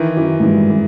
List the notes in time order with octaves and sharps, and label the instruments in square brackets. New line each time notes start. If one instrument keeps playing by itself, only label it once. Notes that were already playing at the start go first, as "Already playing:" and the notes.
Already playing: [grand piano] D#3 E3
[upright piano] F#2 [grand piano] E3
[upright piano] G#2
[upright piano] G2 [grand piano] E3
[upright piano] G#2
[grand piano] E3